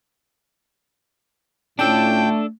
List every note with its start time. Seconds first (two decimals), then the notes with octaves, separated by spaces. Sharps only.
1.79 A2 A3 C#4 D4 F4 A4 G5